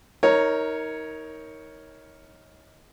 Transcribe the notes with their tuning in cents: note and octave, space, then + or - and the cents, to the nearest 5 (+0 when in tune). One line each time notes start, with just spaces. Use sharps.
D#4 +25 A#4 +0 C#5 +0